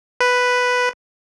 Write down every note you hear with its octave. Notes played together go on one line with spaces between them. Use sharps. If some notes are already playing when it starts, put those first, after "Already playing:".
B4